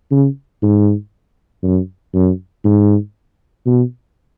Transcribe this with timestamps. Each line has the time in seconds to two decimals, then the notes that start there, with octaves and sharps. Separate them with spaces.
0.11 C#3
0.62 G#2
1.63 F#2
2.14 F#2
2.64 G#2
3.66 B2